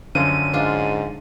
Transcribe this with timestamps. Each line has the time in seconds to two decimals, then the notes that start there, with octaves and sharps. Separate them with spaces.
0.15 F#2 D3 F3 C#4 D#7
0.53 G#2 D4 F4